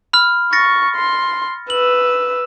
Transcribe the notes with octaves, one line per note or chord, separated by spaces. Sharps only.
B5 F6
C#6 A6 A#6 C#7
C6
B4 E6 F#7